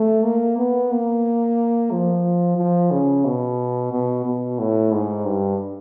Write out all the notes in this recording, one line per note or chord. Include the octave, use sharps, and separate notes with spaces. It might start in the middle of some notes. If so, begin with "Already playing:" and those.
Already playing: A3
A#3
B3
A#3
F3
F3
C#3
B2
B2
B2
A2
G#2
G2